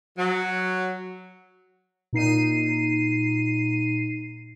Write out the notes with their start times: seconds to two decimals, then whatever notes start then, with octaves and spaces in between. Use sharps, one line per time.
0.18 F#3
2.13 A#2 D#4 C7 D#7